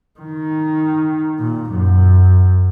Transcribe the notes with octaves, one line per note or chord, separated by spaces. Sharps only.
D#3
A#2
F#2